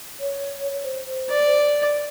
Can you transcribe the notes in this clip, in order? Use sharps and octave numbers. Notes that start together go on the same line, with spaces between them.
C#5
C5
D5